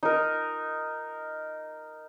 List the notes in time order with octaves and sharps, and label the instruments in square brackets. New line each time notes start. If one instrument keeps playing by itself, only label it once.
[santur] D#4 A#4